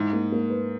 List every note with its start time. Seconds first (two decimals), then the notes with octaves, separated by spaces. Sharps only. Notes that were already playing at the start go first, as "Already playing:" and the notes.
Already playing: G#2 E4
0.13 A#3
0.32 A#3
0.50 B4